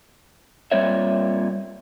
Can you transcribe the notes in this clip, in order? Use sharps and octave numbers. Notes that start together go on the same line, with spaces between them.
A#2 G3 C4 C#5 E5